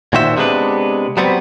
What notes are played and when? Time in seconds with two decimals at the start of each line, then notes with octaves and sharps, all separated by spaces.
0.13 A#2 D#3 F#4 C5 E5
0.37 C3 G#3 B3 D4 B4
1.17 F#3 G3 B3 C4